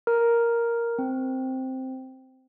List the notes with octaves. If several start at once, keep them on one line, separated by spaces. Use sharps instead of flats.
A#4
C4